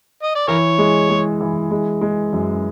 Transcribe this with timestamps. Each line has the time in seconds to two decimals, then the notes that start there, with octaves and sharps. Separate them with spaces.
0.23 D#5
0.36 D5
0.48 E3 A#4 C#5
0.78 G#3
1.10 G#3
1.41 E3
1.71 G#3
2.01 G#3
2.33 F#2